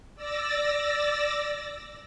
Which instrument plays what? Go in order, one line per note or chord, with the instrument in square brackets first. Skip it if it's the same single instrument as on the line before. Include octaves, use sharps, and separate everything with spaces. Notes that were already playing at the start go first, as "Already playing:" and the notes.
[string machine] D5 E6 A6 A#6